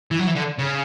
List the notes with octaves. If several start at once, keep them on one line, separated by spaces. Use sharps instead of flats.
E3
F#3
E3
D3
C#3